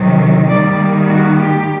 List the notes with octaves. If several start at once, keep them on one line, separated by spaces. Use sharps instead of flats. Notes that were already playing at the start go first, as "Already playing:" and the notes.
Already playing: C3 D#3 F#3
D#3 G3 A#3 D5
F#4
G4